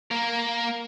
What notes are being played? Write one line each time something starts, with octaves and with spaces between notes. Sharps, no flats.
A#3 A#4